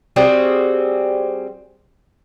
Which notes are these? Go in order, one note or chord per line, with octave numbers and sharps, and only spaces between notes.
G3 C4 F#4 G#4